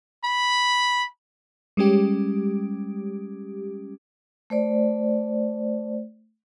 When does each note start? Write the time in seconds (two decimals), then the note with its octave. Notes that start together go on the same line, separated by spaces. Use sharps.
0.24 B5
1.77 G3 G#3 C#4 G4
4.50 A3 C5 D5